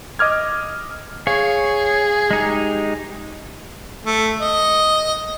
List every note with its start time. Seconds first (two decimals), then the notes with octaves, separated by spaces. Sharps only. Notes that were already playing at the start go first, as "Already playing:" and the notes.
0.19 D#5 D6 F6 G#6
1.27 G#4 C#5 F5 C#6
2.31 G#3 D#4 G4
4.06 A3
4.40 D#5